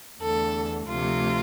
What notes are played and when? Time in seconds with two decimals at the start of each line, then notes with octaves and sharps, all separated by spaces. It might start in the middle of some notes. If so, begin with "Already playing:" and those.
0.21 E2 D3 A3 A4
0.88 D2 C3 F3 A3 F4